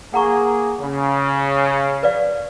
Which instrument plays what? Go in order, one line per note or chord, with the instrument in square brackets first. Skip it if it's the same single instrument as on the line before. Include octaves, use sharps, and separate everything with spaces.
[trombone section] A#3 G#4 [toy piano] F#5 A#5 C#6
[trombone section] C#3
[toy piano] B4 D5 F5